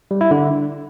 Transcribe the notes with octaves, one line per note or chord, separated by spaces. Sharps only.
G3
E4
D3